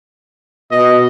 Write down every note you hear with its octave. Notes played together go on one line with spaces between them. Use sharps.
B2 D#5